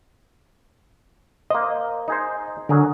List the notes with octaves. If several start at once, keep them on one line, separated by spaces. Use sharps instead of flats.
A#3 C5 D#5
D#4 G#4 C5
D3 F#3 G#4 A#4